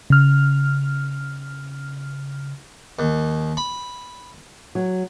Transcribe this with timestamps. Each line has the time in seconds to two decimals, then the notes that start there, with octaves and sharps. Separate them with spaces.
0.10 C#3 F6
2.99 D#2
3.57 B5
4.75 F#3